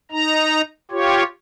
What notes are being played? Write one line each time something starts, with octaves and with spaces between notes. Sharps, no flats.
D#4 A#5
F4 G4 C#5